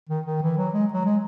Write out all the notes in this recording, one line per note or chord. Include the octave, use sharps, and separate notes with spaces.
D#3
D#3
E3
F#3
G#3
F#3
G#3